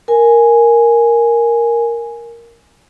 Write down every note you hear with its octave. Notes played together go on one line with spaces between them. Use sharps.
A#4 G#5